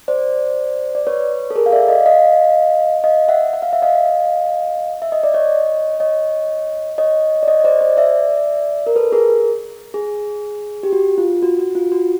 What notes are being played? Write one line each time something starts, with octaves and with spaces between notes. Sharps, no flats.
C5 D5
D5
B4 C#5
A4
G#4 A#4
F5
D5 E5
D#5 F5
D#5 F5
D#5 F5
E5 F#5
F#5
F5
E5
D#5 F5
E5
D#5
D5
C#5 D#5
C#5 D#5
C#5 D#5
D5
C#5 D#5
D#5
C5 D5
C5 D5
D5 E5
A#4
A4 B4
G#4 A#4
G#4
G4
F#4
F4
F#4
F#4
F4
F#4